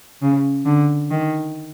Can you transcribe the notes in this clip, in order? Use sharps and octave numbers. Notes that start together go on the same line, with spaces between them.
C#3
D3
D#3